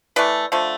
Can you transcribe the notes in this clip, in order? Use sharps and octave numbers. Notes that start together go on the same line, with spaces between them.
E3 A3 B4 D5
D3 F3 A3